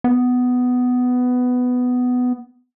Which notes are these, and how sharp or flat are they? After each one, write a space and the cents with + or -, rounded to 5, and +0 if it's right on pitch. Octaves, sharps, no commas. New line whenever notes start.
B3 +10